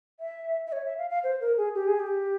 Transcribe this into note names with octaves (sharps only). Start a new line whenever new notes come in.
E5
E5
C#5
E5
F5
F5
C5
A#4
G#4
G4
G#4
G4